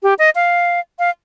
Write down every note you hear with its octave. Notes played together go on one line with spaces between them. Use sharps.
G4
D#5
F5
F5